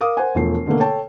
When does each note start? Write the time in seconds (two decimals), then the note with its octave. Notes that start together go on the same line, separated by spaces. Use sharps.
0.01 A#4 F5 D6 D#6
0.17 A#4 C5 F#5 G#5
0.35 E1 F3 A3 C7
0.66 B2 D3 A3 A#3
0.80 A4 C#5 G5 A5